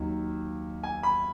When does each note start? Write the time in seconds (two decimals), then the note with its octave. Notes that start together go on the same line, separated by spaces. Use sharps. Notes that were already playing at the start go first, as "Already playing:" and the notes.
Already playing: D#2 D#3 F#3
0.83 G#5
1.03 B5